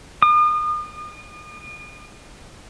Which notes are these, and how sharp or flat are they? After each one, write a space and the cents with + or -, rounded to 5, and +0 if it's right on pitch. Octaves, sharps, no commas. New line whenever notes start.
D#6 -40